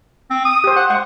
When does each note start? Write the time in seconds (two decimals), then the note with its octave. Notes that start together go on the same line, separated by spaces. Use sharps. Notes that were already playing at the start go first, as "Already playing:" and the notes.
0.30 C4
0.45 D#6
0.64 G4 C5
0.76 F#5
0.90 G#3 F#5